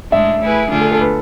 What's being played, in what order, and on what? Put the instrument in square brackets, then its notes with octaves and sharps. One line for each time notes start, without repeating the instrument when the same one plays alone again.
[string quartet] A2 G#3 D4 [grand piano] E5
[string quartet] A3 E4 G#4 B4
D3 A3 D4 F4 G#4
[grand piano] A4
A4
B4